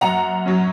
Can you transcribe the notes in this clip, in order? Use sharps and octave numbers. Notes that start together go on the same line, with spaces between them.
F#2 F#5 A#5
F#3 C#4